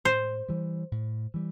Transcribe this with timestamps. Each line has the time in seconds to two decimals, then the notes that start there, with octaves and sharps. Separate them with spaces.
0.05 A2 C5
0.49 E3 G3
0.92 A2
1.34 E3 G3